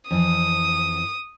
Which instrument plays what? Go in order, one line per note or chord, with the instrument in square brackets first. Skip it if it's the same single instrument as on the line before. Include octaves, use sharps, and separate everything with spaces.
[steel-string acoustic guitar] F2 E3 [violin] D#6